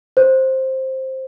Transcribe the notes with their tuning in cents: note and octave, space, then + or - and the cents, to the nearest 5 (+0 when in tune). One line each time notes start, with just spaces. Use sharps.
C5 +10